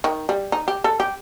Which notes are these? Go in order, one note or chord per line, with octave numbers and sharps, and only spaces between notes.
D#3
G3
D#4
G4
A4
G4